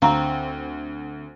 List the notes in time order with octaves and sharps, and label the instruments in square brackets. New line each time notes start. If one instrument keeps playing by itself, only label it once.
[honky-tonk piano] D2 [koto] C4 [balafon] F5 A#5 C#6